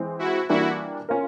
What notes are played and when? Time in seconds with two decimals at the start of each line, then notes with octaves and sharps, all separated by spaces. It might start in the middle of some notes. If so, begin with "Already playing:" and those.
Already playing: E3 G#3 C4
0.19 E4 F#4
0.49 E3 G3 A#3 D4 E4 F#4
1.09 C#4 F4 A#4